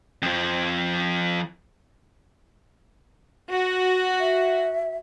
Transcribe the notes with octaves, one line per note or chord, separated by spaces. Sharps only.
F2 F3
F#4
E5